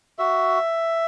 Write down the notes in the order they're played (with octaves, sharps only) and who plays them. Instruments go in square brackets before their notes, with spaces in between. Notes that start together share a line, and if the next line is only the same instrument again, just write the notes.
[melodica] F#4 E5